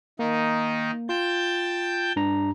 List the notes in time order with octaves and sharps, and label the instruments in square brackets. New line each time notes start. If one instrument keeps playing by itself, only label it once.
[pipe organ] D#3 D#4 [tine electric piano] A#3
[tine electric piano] F4 [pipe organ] G5 A5 G6
[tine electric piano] G2 D4 A#5